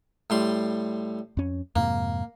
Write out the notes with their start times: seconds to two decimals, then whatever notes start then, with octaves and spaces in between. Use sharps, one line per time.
0.30 A2 G3 C6
1.37 F2 C#4
1.76 F2 G#2 C3 A#3